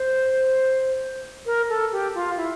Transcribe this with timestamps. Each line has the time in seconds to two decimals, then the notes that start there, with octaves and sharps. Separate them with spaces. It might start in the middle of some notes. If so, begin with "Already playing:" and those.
Already playing: C5
1.46 A#4
1.69 A4
1.92 G4
2.15 F4
2.37 E4